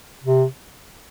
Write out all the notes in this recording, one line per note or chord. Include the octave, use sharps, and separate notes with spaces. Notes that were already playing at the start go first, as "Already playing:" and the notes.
C3